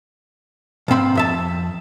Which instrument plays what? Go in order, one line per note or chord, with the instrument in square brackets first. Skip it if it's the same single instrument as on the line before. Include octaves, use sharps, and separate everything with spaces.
[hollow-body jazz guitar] B1 G#2 C4 B5
F2 E5 A5